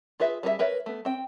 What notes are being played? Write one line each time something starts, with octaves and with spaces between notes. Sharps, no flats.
F4 G#4 B4 E5
G3 G#4 A#4 E5
A#4 B4 C#5 E5
A3 B3
C4 G5